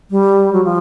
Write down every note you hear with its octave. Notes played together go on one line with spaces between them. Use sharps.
G3
F#3
F3